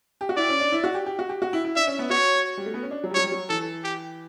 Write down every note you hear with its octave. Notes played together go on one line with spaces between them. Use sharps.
G4
F#4
E4 D5
C#4
D4
E4
F#4
G4
G4
F#4
G4
F#4
E4
E4
D4 E5
C#4
B3
F#4 C#5
G3
A3
B3
C#4
D4
F#3
G3
F#3 C#5
G3
F#3
E3 A4
G4